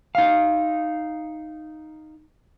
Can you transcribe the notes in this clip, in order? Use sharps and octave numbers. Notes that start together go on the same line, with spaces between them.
D#4 F5